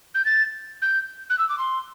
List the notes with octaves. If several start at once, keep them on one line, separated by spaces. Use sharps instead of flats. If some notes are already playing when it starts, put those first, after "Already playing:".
G6
A6
G6
F#6
E6
D6
C6